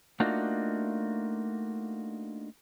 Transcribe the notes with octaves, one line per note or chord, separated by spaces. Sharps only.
A3 A#3 D4 D#4 F4 F#4